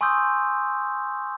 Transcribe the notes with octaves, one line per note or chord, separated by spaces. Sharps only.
G#5 C6 C#6 D#6 E6 G6